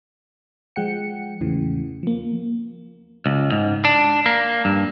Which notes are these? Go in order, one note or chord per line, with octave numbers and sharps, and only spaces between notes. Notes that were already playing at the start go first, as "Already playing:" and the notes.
F3 G#3 F#5 G5 C#7
E2 A2 C#3 E3
F3 A#3
C#2
G#2
D4
A#3
G2